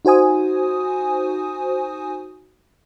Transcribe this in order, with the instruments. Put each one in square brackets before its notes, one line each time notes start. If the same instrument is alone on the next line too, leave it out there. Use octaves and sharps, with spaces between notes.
[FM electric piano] D#4 F#4 C5 G#5 D#6